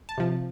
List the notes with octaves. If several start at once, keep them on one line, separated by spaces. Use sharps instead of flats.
A5
C3 F3